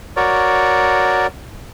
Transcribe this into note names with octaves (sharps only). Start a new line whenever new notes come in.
F#4 A#4 C#5 D5